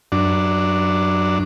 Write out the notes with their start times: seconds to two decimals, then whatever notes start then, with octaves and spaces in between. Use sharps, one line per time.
0.12 F#2 D4